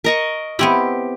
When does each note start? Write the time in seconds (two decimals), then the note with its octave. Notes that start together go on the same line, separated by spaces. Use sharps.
0.04 A#4 D#5 C#6
0.59 B3 C4 E4 G4